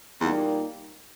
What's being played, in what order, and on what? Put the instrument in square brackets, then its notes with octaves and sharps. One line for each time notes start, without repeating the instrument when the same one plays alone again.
[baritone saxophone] E2 [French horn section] A#2 G3 A#3 D#4